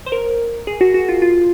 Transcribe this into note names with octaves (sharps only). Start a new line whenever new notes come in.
C5
A#4
G#4
F#4
F#4
F4
F4